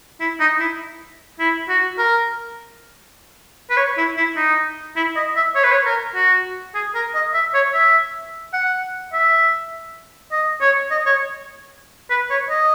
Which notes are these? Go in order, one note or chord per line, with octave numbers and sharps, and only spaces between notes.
E4
D#4
E4
E4
F#4
A#4
B4
C#5
E4
E4
D#4
E4
D#5
E5
C#5
B4
C#5
A#4
F#4
G#4
A#4
D#5
E5
C#5
E5
F#5
E5
D#5
C#5
D#5
C#5
B4
C#5
D#5